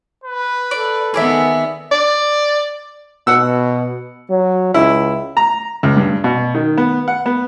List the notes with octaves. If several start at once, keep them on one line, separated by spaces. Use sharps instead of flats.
B4
A4 D5
D#3 B3 G#4 D5 E5
D5
B2 F#5 E6
F#3
C#2 E4
A#5
C#2
G2
B2
D#3
B3
F#5
B3